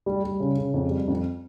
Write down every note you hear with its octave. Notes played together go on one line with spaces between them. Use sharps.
G3
G3
C#3
C#3
F2
G3
F2